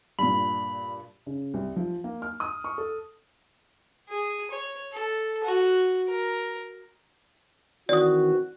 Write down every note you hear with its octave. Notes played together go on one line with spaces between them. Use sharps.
G2 A#2 B5
C#3
C2
F3
A#3
F6
D#6
C#6
A4
G#4
C#5
A4
F#4
A#4
D#3 E3 C4 F#4 D5 D#6